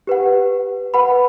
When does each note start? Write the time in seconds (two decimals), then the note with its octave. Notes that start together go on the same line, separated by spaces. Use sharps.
0.07 G4 B4 F#5
0.94 B4 F#5 B5